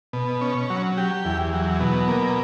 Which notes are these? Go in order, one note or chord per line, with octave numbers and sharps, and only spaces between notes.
B2
C#4
F#3
G4
E2
F#3
B2
A#3